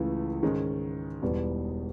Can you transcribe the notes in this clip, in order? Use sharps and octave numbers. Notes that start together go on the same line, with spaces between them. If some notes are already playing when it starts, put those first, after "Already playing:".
Already playing: C#2 C#3 E3 A3
G#2 D#3 G#3 C#4
E1 E2 B2 G3